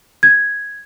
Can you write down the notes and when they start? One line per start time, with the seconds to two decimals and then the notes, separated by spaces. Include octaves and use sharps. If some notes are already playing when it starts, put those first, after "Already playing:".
0.23 G#6